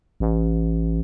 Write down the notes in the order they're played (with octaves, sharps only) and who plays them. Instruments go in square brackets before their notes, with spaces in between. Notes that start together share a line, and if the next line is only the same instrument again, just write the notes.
[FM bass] A1